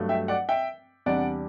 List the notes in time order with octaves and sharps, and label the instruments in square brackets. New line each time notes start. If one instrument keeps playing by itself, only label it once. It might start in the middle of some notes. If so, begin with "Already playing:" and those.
Already playing: [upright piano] G2 F#3 A3
E5 G5
D5 F#5
E5 G5
E2 C3 G3 D4 D5 F#5